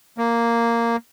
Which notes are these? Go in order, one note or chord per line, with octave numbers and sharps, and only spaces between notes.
A#3